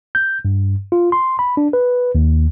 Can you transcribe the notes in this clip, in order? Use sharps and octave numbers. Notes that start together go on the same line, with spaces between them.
G6
G2
F4
C6
B5
D4
B4
D#2